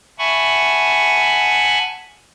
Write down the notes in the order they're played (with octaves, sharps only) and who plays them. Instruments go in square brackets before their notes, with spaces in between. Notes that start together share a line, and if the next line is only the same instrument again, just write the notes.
[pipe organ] E5 F#5 G#5 A5 B5 C#6